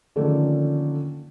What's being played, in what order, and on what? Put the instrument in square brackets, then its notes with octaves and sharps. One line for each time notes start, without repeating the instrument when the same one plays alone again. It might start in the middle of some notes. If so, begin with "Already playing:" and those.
[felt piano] D3 D#3 F3 A3 A#3 C#4